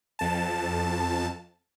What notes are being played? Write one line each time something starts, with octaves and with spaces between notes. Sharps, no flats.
F2 A5